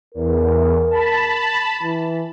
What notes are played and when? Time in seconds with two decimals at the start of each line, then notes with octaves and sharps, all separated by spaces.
0.14 E2 A#4
0.91 A5 B5
1.83 E3